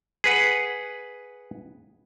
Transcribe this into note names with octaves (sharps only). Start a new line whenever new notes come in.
G#4 B4 F#5